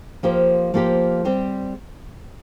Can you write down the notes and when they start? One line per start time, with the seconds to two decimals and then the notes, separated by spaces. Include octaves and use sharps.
0.23 F3 A#3 G4 C5
0.74 F3 A#3 G4 C5
1.25 G3 C4 G4 C5